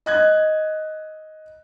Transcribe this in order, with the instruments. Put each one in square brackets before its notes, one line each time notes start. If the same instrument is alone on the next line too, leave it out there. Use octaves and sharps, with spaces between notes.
[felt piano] D#5 F#6 G#6